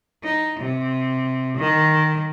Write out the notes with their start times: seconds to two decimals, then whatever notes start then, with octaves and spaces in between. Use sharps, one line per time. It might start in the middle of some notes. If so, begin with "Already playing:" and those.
0.24 D#4
0.60 C3
1.58 D#3